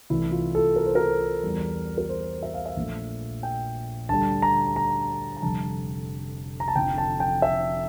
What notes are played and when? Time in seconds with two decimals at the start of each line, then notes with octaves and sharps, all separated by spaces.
0.10 C2 C3 E3 A3 E4
0.32 F4
0.55 A4
0.76 A#4
0.86 C5
0.95 A#4
1.43 E2 E3 G3
1.98 A#4
2.09 C5
2.43 E5
2.54 F5
2.66 E5
2.76 A#1 A#2 F3 A3
3.43 G5
4.09 D2 D3 G3 A5
4.42 A#5
4.76 A#5
5.37 A#5
5.42 F1 F2 D3 G3 A5
6.60 A#5
6.68 A5
6.75 F1 F2 D3 F3 G5
6.98 A5
7.20 G5
7.42 E5